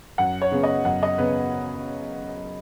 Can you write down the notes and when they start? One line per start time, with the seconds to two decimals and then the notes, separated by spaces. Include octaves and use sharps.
0.18 F#2 F#5
0.42 C#5
0.52 C#3 B3 G#4
0.63 D#5
0.85 F#2 F#5
1.03 D#5
1.18 C#3 B3 B4